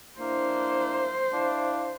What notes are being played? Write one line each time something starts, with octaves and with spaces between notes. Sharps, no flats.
A#3 D4 E4 C5
D4 E4 F5